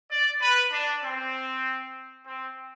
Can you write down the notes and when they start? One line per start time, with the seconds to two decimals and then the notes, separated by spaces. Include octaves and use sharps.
0.10 D5
0.41 B4
0.73 D4
1.04 C4
2.26 C4